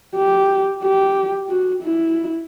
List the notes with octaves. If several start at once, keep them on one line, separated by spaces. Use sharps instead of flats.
G4
G4
F#4
E4